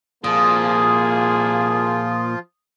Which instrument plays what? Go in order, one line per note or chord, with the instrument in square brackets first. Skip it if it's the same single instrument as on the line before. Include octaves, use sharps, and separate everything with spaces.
[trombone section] C2 A#3 G#4 [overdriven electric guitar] A#2 [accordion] F3 F4 [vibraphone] D#6